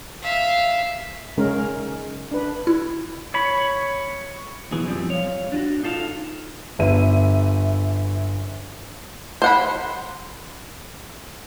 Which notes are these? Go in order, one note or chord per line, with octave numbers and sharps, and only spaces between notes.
E5 F5
C#3 G#3 C#4 A#4
D4 B4
E4
C#5 B5
B1 B2 E3 G#4
F#2 F3 G3 C4
C#5 F5
D4 F4 F#4
D#4 F4 A4 D5 F5
G1 E5 D#7
C5 F#5 B5